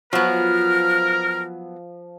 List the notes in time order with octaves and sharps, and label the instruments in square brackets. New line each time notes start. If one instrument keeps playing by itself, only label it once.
[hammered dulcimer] F3 [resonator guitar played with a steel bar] F#3 B3 [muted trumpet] A#4 [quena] F6